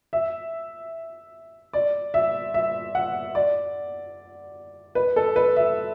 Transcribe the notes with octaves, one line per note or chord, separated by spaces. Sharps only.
E5
D5
E5
E5
F#5
D5
B4
A4
B4
E5